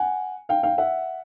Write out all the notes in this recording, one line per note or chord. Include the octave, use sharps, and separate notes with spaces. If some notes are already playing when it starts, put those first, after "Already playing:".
Already playing: F#5 G#5
F5 G5
F5 G5
E5 F#5